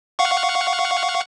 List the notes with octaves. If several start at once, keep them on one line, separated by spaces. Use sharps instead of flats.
F5 F#5 C#6